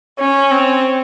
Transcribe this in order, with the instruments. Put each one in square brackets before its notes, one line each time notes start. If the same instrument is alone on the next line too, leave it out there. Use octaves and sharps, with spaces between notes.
[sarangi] C#4 [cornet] C#5
[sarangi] C4